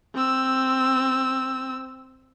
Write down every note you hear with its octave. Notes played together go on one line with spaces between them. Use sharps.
C4 E6